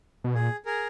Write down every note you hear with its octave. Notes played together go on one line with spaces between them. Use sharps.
B2
A#2 G#4
G#4 A#4